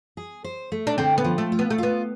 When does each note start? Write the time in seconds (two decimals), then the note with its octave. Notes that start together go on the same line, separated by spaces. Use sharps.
0.17 G#4
0.44 C5
0.72 A3
0.87 D4
0.98 D3 C4
1.18 B3
1.24 F3
1.38 A3
1.52 F4
1.59 B3
1.70 A3
1.78 B3 F4